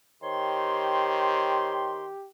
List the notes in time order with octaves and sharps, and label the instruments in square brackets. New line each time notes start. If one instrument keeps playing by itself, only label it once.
[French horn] D#3 [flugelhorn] G4 [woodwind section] C5 C#5 C6